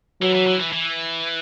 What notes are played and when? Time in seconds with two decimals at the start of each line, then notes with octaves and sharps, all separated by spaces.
0.21 E3 F#3
0.35 E3
0.47 E3
0.60 E3
0.73 E3